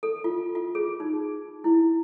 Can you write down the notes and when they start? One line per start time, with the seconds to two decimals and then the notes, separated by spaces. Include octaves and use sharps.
0.03 A4
0.24 F4
0.55 F4
0.75 G#4
1.00 D#4
1.64 E4